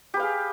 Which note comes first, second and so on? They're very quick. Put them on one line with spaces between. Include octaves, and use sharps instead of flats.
G4 B4 F5 G#4